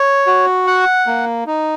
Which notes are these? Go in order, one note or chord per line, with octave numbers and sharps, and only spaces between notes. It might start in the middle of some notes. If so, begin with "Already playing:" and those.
Already playing: C#5
F#4
F#5
A#3
D#4